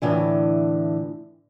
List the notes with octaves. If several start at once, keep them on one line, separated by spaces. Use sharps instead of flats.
A2 D3 E3